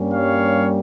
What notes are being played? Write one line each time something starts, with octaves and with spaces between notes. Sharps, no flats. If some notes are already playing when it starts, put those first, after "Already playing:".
Already playing: G2 G3 A#3 C#4
C#5 F5